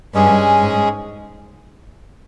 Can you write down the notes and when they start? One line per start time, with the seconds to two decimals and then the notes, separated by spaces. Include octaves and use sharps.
0.14 G2 G#3 C#4 G#4
0.61 G#2